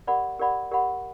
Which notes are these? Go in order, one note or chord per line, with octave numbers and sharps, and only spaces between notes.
G4 A#4 D5 F#5 B5
G4 A#4 D5 F#5 B5
G4 A#4 D5 F#5 B5